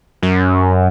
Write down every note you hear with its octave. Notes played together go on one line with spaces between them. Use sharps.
F#2